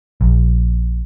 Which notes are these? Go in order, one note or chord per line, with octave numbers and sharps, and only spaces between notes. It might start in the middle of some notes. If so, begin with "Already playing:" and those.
A#1